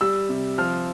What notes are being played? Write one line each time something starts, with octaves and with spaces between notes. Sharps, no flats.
G3 E6
C3
F3 F6